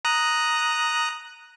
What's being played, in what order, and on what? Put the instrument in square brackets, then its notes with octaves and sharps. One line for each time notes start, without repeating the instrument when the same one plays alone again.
[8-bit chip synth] A#5 D#6 F#6